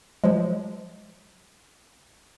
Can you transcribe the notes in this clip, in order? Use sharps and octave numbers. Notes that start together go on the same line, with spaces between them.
F3 F#3 G#3